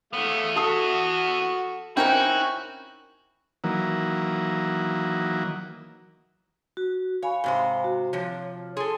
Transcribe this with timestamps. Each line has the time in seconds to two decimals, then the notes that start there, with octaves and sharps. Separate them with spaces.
0.13 E3 A3 B3 F5 D#6
0.56 F#4 A4 D#6 C7
1.97 C4 C#4 D#4 E4 F#4 A#4 G5 G#5
3.64 D#3 E3 F#3 A#3
6.77 F#4
7.23 C#5 F5 G#5 B5
7.44 G#2 C3 C5
7.84 F#4
8.13 C3 F3 C#5
8.77 G#4 A4 C6